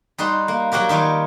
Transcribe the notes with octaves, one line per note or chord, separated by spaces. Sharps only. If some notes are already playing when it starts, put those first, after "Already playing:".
G3 D#4 F#4 C5
A#3
F#3 A#3 F#4 G4 A#4
D#3 G3 F4 C#5